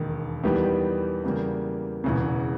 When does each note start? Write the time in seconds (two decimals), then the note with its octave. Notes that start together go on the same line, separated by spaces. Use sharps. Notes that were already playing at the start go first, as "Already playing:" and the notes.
Already playing: E1 D#2 D#3
0.44 E2 D#3 G3 B3 G4
1.24 E2 C#3 G3 A#3
2.04 E1 E2 C#3